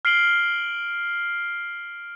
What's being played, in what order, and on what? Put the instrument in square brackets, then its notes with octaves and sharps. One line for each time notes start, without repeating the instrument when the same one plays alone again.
[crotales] F6 C7 D7 F#7 G7